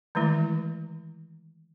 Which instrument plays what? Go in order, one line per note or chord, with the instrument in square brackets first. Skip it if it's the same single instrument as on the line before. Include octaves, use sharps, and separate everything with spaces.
[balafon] D#3 E3 G#3 A3 E4